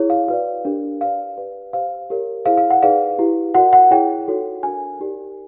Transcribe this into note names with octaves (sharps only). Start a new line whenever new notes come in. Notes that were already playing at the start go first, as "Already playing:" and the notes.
Already playing: E4 G#4 C#5
F5
F#4 B4 D5 F5
D4 G4 A#4
G4 B4 D5 F5
G4 B4 D5
G4 C5 F5
G4 A#4 C#5
E4 G#4 C5 F5
F5
F#5
D#4 G#4 B4 D5 F5
E4 G4 B4
F#4 A#4 D5 F#5
F#5
E4 G#4 C#5 G5
D#4 F#4 A4 C#5
D4 F#4 A#4 G#5
D#4 G4 A#4 D5